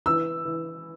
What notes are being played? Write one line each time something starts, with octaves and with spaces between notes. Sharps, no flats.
E3 E6
E3